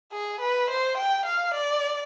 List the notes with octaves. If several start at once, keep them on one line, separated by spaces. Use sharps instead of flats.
G#4
B4
C5
G5
F5
D5